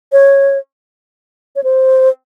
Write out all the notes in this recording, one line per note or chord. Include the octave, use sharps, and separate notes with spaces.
C#5
C#5
C5